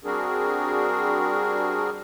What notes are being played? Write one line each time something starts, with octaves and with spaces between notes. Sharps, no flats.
G3 C4 D4 F#4 G#4 A#4